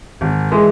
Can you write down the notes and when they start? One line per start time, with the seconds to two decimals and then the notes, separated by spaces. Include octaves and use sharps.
0.21 G#1
0.51 E3 G#3